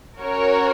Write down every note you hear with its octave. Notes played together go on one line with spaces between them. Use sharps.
C#4 F#4 A#4 C#5